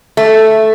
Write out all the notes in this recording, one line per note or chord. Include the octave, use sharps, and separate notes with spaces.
A3